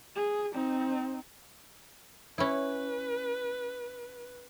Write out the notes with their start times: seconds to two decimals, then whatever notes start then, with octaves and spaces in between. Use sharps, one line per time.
0.16 G#4
0.54 C4 D#4
2.38 C#4 E4 B4